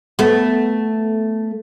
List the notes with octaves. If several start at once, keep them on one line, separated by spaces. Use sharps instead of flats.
A3 B3